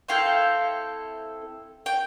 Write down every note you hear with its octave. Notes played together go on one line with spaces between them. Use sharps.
C4 E4 A4 F5 G5
G5